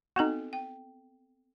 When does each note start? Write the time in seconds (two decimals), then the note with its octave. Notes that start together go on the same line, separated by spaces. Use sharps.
0.16 B3 C4 D#4 F#4 A4
0.53 G5